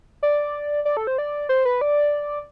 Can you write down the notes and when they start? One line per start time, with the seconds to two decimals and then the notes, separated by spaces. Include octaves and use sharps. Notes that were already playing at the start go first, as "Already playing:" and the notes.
0.23 D5
0.85 D5
0.97 A4
1.07 C5
1.18 D5
1.49 C5
1.65 B4
1.81 D5